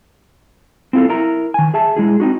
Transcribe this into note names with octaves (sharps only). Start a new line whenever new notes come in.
C4 E4 F4 G#4 A4
E4 A#4 A#5
D#3 G#5
G#4 E5 A5
G#3 E4 G#4
C4 D#4 F#4